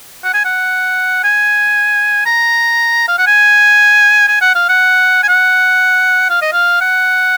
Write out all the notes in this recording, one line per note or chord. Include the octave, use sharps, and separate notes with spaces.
F#5
G#5
F#5
G#5
A#5
F5
F#5
G#5
G#5
F#5
F5
F#5
G#5
F#5
F5
D#5
F5
F#5